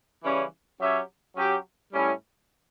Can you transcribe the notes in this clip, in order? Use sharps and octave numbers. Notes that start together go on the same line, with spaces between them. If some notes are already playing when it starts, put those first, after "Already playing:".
C#3 E3 G3 C#4
F#3 C#4 G4 C#5 E5
F#3 C#4 G4
A2 G3 C#4 E4